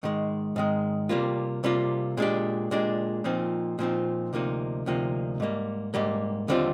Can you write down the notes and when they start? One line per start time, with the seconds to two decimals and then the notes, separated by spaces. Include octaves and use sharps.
0.03 G#2 D#3 G#3
0.56 G#2 D#3 G#3
1.09 C3 G3 A#3 F4
1.64 C3 G3 A#3 F4
2.17 A#2 G#3 D4 G4
2.71 A#2 G#3 D4 G4
3.24 A#2 F3 C4 D#4
3.79 A#2 F3 C4 D#4
4.33 D2 C3 F3 A#3 D#4
4.86 D2 C3 F3 A#3 D#4
5.40 G#2 G3 A#3
5.94 G#2 G3 A#3
6.48 D#2 D3 G3 C4 F4